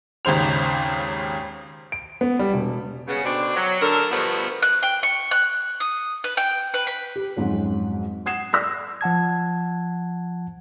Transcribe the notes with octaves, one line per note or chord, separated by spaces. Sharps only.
G#1 D#2 C#3 C5 F7
D7
B3
G3
E1
C#3 B3
B2 D3 C4 D4
F#3
D3 A4 A#4
G2 B2 D3 F3 A3 B3
F#6
G5
C#6
F#6
D#6
B4
G5
B4
B5
G4
F2 G#2 F#3 C#4
F#5 D#6 G#6 C7 E7
D5 E6 A#6 B6
F3 F#5 A5 G#6